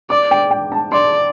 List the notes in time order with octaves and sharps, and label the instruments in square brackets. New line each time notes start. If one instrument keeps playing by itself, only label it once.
[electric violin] D5 [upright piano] D6
[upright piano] G5
G5
A5
[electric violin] D5 [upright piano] C6